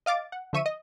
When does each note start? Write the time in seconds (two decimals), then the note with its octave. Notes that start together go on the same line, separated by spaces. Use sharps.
0.06 D#5 F5 D6 A6
0.32 F#5
0.53 D3 F3 E5 C#6 D#7
0.66 D#5